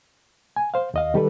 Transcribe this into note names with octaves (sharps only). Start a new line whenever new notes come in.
G#5
C5 F5
D#2 D#5 F5
D#3 G3 G4 A4 B4